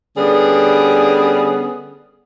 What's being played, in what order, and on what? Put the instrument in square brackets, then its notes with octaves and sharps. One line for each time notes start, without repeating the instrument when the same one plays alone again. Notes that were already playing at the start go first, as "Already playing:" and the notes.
[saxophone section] D3 G3 B3 C#4 G#4